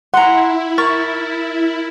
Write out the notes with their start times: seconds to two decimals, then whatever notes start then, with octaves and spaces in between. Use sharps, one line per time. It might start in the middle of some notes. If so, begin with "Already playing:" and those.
0.14 E4 F#5 A#5 C6
0.78 A#4 C#6 F6 A6